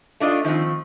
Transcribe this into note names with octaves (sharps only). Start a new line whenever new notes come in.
A3 D4 F4 D#5
D#3 F3 A3 C4